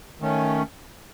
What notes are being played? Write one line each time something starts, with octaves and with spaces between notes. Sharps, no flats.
D#3 A3 C#4